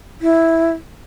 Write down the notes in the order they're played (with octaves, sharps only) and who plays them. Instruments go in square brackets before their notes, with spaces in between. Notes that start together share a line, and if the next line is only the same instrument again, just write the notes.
[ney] E4